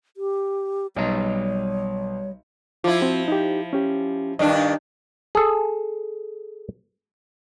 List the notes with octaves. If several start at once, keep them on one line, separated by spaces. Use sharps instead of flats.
G4
B1 G3 C#5 D#5 A#5
F3 E4 F4 D6
C4 F#4
D#4 G4
C#4 G4
G2 D#3 D4 D#5
G#4 A4